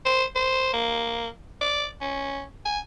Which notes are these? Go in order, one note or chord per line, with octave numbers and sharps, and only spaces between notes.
C5
C5
A#3
D5
C#4
G#5